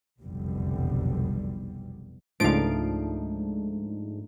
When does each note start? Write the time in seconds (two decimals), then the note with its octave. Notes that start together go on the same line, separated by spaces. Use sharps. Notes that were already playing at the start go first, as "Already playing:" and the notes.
0.21 F1 B1 E2 B2 D3 G3
2.40 C#2 G#2 F3 A3 D4 D#4 F5 D7